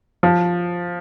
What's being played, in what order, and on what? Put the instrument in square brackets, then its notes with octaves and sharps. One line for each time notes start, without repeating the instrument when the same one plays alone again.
[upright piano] F3